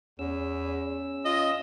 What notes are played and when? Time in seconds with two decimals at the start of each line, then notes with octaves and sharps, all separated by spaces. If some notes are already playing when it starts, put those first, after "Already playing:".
0.19 E2 C#4 E6
1.25 F4 D#5